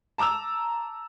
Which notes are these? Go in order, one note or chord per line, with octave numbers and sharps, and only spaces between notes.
A5 A#5 D6 E6 F7